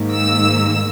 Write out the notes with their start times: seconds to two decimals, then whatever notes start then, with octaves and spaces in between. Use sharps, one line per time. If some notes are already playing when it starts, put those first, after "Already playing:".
Already playing: G#2 D#3 A#3
0.14 E6